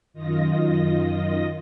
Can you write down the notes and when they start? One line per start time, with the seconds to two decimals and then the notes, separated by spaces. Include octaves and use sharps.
0.14 F#2 D#3 F4 D#5 A#6